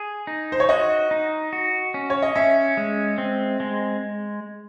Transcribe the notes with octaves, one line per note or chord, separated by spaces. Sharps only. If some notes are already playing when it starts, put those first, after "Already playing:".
Already playing: G#4
D#4
C5
C#5
F#4 D#5
D#4
F#4
C#4
C#5
D#5
C#4 E5
G#3
C4
G#3